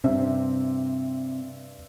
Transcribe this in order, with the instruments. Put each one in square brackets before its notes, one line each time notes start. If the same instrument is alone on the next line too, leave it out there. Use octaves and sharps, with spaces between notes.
[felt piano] G2 C4 E5 [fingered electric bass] C3